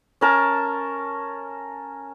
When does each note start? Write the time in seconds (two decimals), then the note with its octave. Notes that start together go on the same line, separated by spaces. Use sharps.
0.21 C#4 A#4 A5